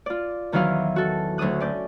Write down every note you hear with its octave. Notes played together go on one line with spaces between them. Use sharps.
F4 D5
E2 D#3 E3 F#3 E4 F5
F#4 A4
D2 F#3 D4 D#6 F#6
C#4 D5 G6